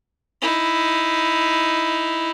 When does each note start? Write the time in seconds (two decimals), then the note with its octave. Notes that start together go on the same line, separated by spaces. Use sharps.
0.42 D#4 E4